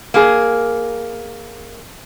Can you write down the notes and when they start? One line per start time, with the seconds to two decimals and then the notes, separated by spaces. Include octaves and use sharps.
0.14 A#3 G#4